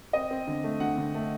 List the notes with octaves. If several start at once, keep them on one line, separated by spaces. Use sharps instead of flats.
C4 D#5
C4
D3
A3
D3 F#5
D3
A3